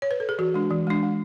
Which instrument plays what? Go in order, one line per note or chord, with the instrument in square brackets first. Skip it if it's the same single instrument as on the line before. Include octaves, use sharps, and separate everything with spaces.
[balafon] C#5
B4
A4
G#4
E3 F#4
G#3 D4
E3
G#3 D4
G#3